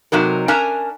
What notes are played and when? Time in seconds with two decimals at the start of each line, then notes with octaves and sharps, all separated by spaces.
0.12 C3 F#3 D#4 A#4
0.48 C#4 D4 A#4 E5 G#5 A#5